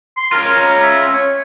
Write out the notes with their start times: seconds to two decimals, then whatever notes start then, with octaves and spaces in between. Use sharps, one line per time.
0.17 C6
0.32 C#4 F4 A#4
0.54 A#5
0.83 E5
1.13 C#5